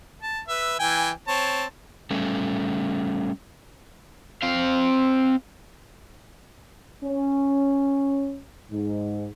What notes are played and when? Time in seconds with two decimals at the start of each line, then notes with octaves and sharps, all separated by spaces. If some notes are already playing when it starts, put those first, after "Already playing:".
0.22 A5
0.48 B4 E5
0.79 E3 G5 G#5
1.28 C4 C#5 A5
2.11 G3 A3 C#4
4.42 C4 F5
7.04 C#4
8.71 G#2